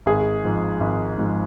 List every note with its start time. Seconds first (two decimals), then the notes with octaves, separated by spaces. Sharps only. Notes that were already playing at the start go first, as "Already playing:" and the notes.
0.06 G#1 G#4
0.44 G#2 F3
0.80 G#1
1.18 G#2 F3